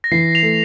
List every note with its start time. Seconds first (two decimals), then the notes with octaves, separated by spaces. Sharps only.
0.04 A#6
0.11 E3 C7
0.35 F7
0.42 A3